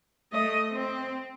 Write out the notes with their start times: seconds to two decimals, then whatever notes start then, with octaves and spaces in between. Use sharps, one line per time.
0.33 A3 D#5
0.72 C4